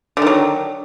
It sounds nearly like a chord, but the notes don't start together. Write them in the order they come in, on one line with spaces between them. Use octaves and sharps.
D3 D#3 F#3